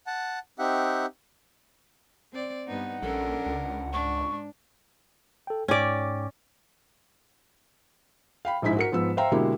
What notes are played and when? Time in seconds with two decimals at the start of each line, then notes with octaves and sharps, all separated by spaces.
0.07 F#5 A5
0.59 C4 D#4 G4 E5 F#5
2.33 C4 D5
2.67 G2 B3 D#4 F#5
3.03 A#1 C#4 D4 A4 A#4
3.46 C#2
3.93 G#2 D4 C#6
5.47 A4 G5
5.68 G#2 C#4 D5 G5 D6
8.45 F5 G5 B5
8.62 A#1 G#2 D#4 E4 B6
8.77 F#4 A#4 C#7
8.92 G#2 F3 B3 E6
9.17 C5 E5 F5 G5 A#5
9.32 B2 D3 G#3 A#3 E4 G4